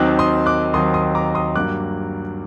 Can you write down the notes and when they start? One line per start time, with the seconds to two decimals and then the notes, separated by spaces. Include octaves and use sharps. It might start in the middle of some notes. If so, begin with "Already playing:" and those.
Already playing: D#2 D#3 F#3 C4 D#4 D6 F#6
0.19 C6 D#6
0.46 D6 F#6
0.73 D#2 D#3 F#3 C4 D#4 C6 D#6
0.94 C6 D#6
1.15 A#5 D6
1.35 C6 D#6
1.55 G2 F#3 A#3 D6 F#6